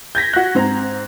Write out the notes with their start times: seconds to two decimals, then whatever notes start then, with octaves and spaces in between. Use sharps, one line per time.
0.15 G6 G#6 A#6 B6
0.33 F#4 F#6
0.55 G#2 C4 A#5